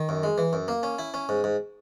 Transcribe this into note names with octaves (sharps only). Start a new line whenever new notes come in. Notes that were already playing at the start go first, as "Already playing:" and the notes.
Already playing: D#3
F#2
G#3
E3
F#2
A#3
C#4
E4
C#4
G#2
G#2